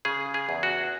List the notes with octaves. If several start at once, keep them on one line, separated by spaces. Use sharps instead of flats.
C#3 G#4
G#4
E2
F#4